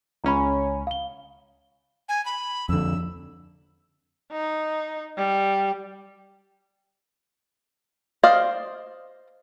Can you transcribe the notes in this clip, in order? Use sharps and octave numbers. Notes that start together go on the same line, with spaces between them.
C#2 C#4 A#5 B5
F5 G7
G#5
B5
F2 D3 E6
D#4
G3
C5 D5 D#5 F5